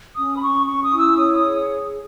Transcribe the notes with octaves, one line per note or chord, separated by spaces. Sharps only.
C#4 D#6
B5
C#4 C#6
C#4 C#6
D#6
E4
E6
C#5 D#6
D#6
G#4